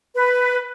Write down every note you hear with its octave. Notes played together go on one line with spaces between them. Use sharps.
B4